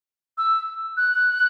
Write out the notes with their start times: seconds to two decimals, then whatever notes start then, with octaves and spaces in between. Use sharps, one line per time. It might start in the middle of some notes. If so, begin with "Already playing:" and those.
0.38 E6
0.97 F#6